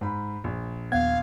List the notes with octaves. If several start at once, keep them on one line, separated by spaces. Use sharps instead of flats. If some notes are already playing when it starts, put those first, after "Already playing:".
G#2 B5
A#1
D#2 B3 F5 G#6